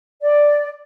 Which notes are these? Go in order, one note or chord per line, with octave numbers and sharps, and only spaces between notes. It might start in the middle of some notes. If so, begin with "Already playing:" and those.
D5